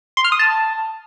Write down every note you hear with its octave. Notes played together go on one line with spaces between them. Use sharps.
C6
F6
D#6
A5